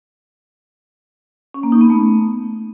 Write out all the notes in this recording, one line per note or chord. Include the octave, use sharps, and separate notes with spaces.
C#4
A#3
D#4
B3
A3